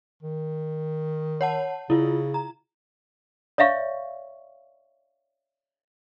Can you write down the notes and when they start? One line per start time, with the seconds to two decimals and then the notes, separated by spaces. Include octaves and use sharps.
0.23 D#3
1.41 C#5 F#5 A5
1.90 C#3 E4 F4
2.34 A#5
3.58 C#5 D5 E5 F5 C#6